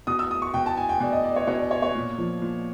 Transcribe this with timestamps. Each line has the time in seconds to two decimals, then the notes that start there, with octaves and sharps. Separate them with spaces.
0.07 B2 D#6
0.19 E6
0.31 D#6
0.42 C#6
0.54 B2 G5
0.66 A5
0.77 G#5
0.89 G5
1.00 B2 D5
1.13 D#5
1.24 D5
1.36 C#5
1.47 B2 C#5
1.60 D5
1.71 C#5
1.82 C#5
1.95 A#2
2.18 F3
2.42 A#2